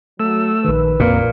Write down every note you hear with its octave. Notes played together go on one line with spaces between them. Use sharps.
F#3 A3 E6
A#1 D#3 B4
F2 A#2 A#3